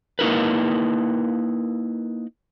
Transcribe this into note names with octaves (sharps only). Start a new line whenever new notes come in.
A#3 D#4 E4 A#4 B4